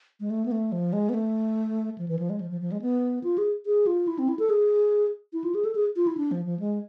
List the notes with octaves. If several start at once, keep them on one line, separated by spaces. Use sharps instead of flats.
G#3
A3
B3
A3
F3
G#3
B3
A3
F3
E3
F3
G#3
F3
F3
F3
G#3
B3
F4
G#4
G#4
F4
E4
C4
E4
A4
G#4
E4
F4
G#4
A4
G#4
F4
E4
D4
F3
F3
G#3